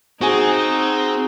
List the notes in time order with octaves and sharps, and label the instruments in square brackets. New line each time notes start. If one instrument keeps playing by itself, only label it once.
[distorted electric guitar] C4 [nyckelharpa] D#4 [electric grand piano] F#4 G#4 G#5